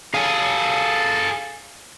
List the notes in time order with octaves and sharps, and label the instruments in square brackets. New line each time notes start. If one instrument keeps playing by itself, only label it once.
[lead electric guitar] G#4 A4 [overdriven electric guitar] F5 G#5